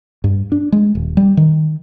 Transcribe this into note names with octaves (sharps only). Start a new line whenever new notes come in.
G2
D4
G#3
D#1
G3
D#3